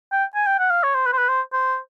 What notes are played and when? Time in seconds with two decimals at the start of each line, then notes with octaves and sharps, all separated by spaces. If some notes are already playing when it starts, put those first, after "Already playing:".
0.12 G5
0.35 G#5
0.47 G5
0.59 F#5
0.70 F5
0.83 C#5
0.95 C5
1.06 B4
1.13 C5
1.18 B4
1.29 C5
1.53 C5